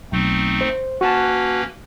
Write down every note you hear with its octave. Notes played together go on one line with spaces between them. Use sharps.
B1 A3 C4 D#4
C5
A#3 C#4 F#4 B4 A5